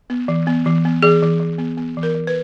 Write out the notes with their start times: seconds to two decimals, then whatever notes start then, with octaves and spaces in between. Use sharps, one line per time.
0.10 B3
0.28 E3
0.47 B3
0.66 E3
0.85 B3
1.03 E3 G#4
1.22 E3
1.40 E3
1.58 B3
1.77 B3
1.97 E3
2.03 A#4
2.15 E3
2.27 B4